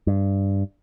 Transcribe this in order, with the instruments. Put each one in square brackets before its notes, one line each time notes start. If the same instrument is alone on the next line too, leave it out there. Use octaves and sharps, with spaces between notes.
[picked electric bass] G2